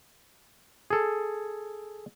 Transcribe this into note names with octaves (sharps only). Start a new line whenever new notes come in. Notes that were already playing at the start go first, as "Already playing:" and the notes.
G#4 A4